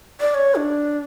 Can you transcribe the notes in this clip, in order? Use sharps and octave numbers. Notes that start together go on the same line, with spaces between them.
D5
C#5
D4